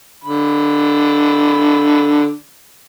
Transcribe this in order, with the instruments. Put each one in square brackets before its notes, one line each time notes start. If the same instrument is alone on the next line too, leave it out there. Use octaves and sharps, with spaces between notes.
[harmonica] D3 B5